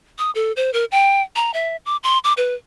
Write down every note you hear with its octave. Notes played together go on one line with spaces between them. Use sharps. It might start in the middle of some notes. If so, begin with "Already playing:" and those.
D#6
A4
C5
A#4
G5
A#5
E5
D6
C6
D6
B4